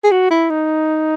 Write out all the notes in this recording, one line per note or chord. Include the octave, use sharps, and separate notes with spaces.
G#4
F#4
E4
D#4